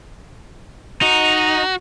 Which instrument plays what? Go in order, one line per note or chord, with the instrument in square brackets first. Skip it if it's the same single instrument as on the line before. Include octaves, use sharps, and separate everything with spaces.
[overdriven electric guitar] D#4 [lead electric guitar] F#4